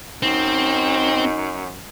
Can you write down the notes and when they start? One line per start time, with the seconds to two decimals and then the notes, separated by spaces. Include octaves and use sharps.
0.23 F#2 C4 D#4